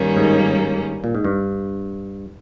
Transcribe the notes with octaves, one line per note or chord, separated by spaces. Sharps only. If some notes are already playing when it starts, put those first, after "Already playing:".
Already playing: G2 D#3 G3 A#3 C#4
G#2
A#2
G#2
G2